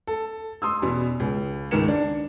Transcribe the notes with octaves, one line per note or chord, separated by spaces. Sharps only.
A4
C6 D#6 E6
E2 B2
C#2
C#2 G#2 D#3 A#4 C#7 E7
D4